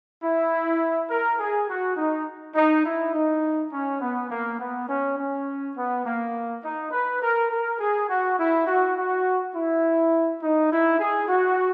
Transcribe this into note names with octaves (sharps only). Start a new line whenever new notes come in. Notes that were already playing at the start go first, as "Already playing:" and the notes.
E4
A#4
G#4
F#4
D#4
D#4
E4
D#4
C#4
B3
A#3
B3
C#4
C#4
B3
A#3
D#4
B4
A#4
A#4
G#4
F#4
E4
F#4
F#4
E4
D#4
E4
G#4
F#4